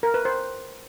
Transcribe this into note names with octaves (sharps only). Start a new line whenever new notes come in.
A#4
B4
C5